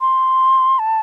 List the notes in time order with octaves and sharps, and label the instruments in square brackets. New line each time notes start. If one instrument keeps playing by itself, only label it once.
[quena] C6
A5